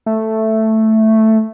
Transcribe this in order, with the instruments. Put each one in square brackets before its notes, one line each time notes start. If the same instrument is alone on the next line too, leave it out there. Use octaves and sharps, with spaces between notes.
[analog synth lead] A3